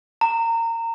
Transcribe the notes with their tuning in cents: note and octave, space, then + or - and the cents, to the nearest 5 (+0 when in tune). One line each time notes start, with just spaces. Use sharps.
A#5 -25